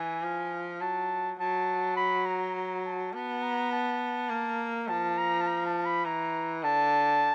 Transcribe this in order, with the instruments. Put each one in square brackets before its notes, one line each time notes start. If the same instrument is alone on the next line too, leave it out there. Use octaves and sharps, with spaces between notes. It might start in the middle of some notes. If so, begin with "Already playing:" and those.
Already playing: [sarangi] E3 [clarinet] G#5
[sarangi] F3
[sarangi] F#3 [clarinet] A5
[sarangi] F#3 [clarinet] A5
[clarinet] B5
A#5
A#5
A5
[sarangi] B3 [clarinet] A5
[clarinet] A#5
A5
[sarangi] A#3
[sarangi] F3 [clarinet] A5
[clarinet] A#5
A5
A#5
A5
B5
[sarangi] E3 [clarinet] A#5
[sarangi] D3 [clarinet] A5